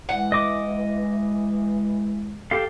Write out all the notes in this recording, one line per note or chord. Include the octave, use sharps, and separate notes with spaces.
E3 G#3 F#5
D#5 D6
G4 A4 F5